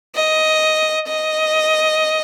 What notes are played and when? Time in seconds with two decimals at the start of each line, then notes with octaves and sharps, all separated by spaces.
0.15 D#5
1.08 D#5